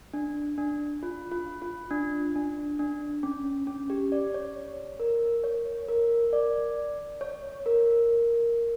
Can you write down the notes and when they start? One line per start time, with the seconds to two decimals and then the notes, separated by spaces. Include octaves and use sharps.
0.14 D4
0.58 D4
1.03 F4
1.32 F4
1.62 F4
1.91 D4
2.35 D4
2.79 D4
3.23 C#4
3.67 C#4
3.90 G4
4.12 D5
4.34 C#5
5.00 A#4
5.44 C#5
5.89 A#4
6.33 D5
7.21 C#5
7.66 A#4